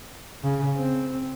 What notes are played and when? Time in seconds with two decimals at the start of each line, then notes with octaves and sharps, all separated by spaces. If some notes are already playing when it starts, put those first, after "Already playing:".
0.44 C#3
0.76 C4